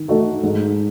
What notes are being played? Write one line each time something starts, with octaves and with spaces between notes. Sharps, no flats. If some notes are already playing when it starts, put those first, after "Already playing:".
Already playing: D#3
A3 D#4 F#4 A4
G#2